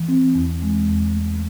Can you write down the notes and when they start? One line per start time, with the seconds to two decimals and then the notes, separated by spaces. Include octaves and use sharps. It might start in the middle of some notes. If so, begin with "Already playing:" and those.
Already playing: E3
0.08 C4
0.35 E2
0.62 G#3
0.88 E2
1.14 A3